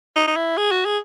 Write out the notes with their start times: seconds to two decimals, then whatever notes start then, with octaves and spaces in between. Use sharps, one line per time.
0.16 D#4
0.27 D#4
0.37 E4
0.57 G#4
0.72 F#4
0.86 G#4